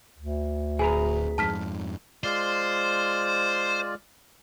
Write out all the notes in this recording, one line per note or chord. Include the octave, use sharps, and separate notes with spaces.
D2
D1 G#4 B4 G#5 A#5
F2 G#2 A5 F6 B6
G#3 F4 C5 D5